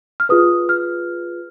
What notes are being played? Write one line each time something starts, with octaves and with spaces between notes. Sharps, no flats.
F6
F4 G#4 B4 D#6
F6